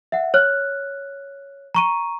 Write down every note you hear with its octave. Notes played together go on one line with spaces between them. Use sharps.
E5 F#5
C#5 F6 F#6
A#5 C#6 D#7